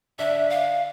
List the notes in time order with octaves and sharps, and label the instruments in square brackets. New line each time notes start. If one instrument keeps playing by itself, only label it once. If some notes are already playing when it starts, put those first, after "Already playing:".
[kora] D3 D4 [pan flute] E5
[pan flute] F5